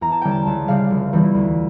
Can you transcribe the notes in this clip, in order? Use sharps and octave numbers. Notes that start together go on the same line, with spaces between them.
E2 A#5
A5
D3 G3 C#4 G5
A5
C#2 A5
C#3 G3 D4 F5
F1
E2 E3 G3
D2